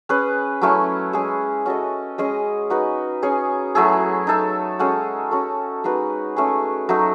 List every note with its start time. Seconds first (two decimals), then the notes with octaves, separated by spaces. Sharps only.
0.09 C#4 G#4 B4
0.61 F#3 A3 C#4 E4
1.13 G#3 C#4 G#4
1.66 C#4 F#4 A4 D#5
2.18 G#3 C#4 G#4 D#5
2.70 D#4 F#4 B4 D#5
3.23 C#4 G#4 C#5
3.75 F#3 A3 E4 G#4
4.27 D#4 A4 E5
4.79 G#3 C#4 F#4 A4
5.31 C#4 F#4 A4
5.84 G#3 D#4 F#4 B4
6.36 A3 C#4 G#4
6.89 F#3 A3 D#4